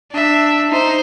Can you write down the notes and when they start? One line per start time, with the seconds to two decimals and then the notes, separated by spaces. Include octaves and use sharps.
0.12 D4 E5
0.69 D#4 C5